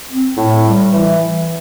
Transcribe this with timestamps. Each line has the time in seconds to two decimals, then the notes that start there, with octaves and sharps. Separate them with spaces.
0.11 C4
0.38 A2
0.65 G3
0.91 E3